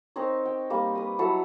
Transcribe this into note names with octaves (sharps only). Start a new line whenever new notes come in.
C4 D#4 A#4 C#5
G5
G3 A#3
B4 D#6
F#3 E4 A4